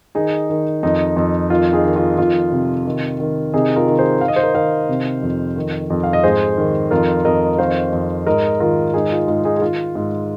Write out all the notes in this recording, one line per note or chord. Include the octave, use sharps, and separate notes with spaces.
D#3 D#4 G#4
D#3
F2 D#4
F2
D#3 F4
D#4 G#4
D#3
F4
F2 F4
C3
D#3
D#3
C3 D#4 G#4
F4 A#4
D#3
G#4 C5
D#3 F5
D#5
C5
A#4 D#5
D#3 C5 F5
C3
F2
D#3
F2
F5
D#5
G#2 G#4 C5
D#3
F2 F4 A#4
F2 A#4 D#5
D#3 C5 F5
F2
G#2 A#4 D#5
D#3 F4 A#4
G#2 D#4 G#4
F4
G#2 F4
D#4 G#4
G#4
D#3 F4
G#2